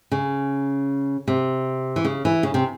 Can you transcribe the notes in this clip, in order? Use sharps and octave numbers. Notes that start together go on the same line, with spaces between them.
C#3
C3
E3
C#3
E3
C#3
C3